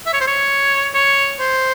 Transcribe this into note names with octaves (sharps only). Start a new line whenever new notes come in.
E5
C#5
C5
C#5
C#5
C5